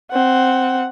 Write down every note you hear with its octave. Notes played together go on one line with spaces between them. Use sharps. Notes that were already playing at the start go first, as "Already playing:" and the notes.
C4 F#5